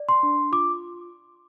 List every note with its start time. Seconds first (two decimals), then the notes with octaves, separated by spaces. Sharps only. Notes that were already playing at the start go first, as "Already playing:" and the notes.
Already playing: D5
0.09 C6
0.23 D4
0.52 F4 D6